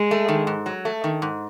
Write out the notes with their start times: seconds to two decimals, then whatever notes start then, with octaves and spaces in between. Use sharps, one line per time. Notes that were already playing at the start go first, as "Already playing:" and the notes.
Already playing: G#3
0.11 A3
0.28 D#3
0.47 G#2
0.66 F#3
0.85 A3
1.04 D#3
1.22 G#2